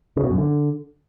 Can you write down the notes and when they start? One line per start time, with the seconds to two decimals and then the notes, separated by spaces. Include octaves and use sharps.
0.17 C#3
0.24 B2
0.31 F#2
0.38 D3